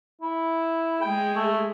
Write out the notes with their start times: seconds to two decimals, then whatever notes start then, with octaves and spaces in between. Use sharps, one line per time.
0.22 E4
1.02 G#3 G#4 G5
1.36 A3